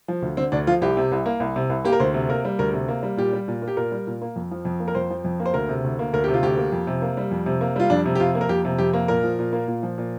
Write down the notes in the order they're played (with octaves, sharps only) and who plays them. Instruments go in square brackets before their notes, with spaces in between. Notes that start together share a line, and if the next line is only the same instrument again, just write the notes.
[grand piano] F3
D2
D3 C4
D2 D4
F3 F4
C2 G4
C3
C2
A#3
C2
C3
C2
A#3 G4
A#4
D2 C5
C3
A#3 A#4
G3
D2 A#4
C3
A#3
G3
A#2 G4
G3
A#2
A#3
G4
A#2 A#4
G3
A#2
A#3
F2
F3
F2
A#3
A#4
F2 C5
F3
F2
A#3
C5
D2 A#4
C3
D2
A#3
D2 A#4
C3 G4
F4
D2 G4
A#3
F2
C3
A#3
G3
F2
C3
A#3
G3 F4
F2 D4
C3
G4
F2 F4
A#3
A#4
F2 G4
C3
F2 G4
A#3
A#2 A#4
F3
A#2
A#3
A#2
F3
A#2